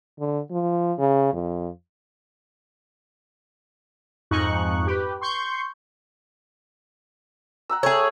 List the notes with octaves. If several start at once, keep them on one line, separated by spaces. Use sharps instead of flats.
D3
F3
C#3
F2
F2 G#2 D#4 C#6 F#6
G4 B4
C6 C#6 G6
F#5 A#5 E6
A3 G#4 C#5